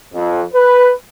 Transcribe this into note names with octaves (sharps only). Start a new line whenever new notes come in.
F2
B4